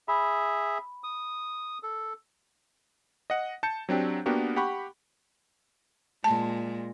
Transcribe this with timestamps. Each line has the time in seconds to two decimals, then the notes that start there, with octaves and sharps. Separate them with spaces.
0.08 G#4 E5 B5
1.04 D#6
1.83 A4
3.30 D#5 F#5
3.63 A5 G6 C#7
3.89 F#3 C4 D4 G4
4.26 A#3 B3 D4 F#4 G4 A#4
4.56 G4 F#5 B5 C#6
6.24 A#2 G#3 A5